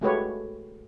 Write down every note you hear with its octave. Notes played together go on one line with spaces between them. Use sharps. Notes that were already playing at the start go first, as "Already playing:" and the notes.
G#3 A3 F#4 G4 B4 C#5